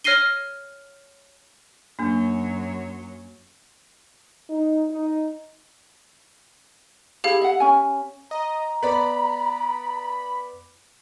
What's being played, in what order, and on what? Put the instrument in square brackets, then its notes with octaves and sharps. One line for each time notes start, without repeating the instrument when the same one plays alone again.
[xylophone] C#5 F6 A#6 C7 D#7 G7
[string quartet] F#2 F#3 C#5 [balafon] A#3 D4
[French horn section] D#4
D#4
[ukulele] E4 G#4 B5 [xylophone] G4 F5
[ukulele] E5 F#5
C#4 G#5
[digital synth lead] D#5 [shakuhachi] A#5
[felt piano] B3 D5 [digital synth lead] B5